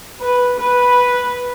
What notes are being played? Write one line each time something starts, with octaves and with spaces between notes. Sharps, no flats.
B4
B4